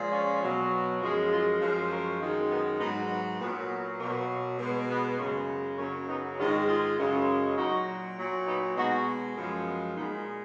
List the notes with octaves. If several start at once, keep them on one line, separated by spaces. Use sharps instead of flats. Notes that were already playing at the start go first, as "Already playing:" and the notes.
Already playing: A#2 F3 G#3
C#4 F4
B2 F#3
F#2 F3 G#3 F4 G#4
F4 G#4
F#2 F3 G#3
A#4 C#5
F#2 D#3 G#3
B3 D#4
G#2 F#3 B3 D#4
B3
A#2 F#3 B3
B3
B2 F#3 A#3
B2 G#3
B3
F#2 C#3 G#3 A#3 C#4
B3
F#2 C#3 F#3 A#3 C#4
B3 D#4
G#2 D#3 G#3 C#4 F4
F4 G#4
F#2 C#3 G#3
A#2 F#3 D#4 F#4
A#2 F#3
B3 D#4
B2 G#3 D#4 F#4
F#2 F3 G#3 B3
B3
A#2 G#3 B3 D#4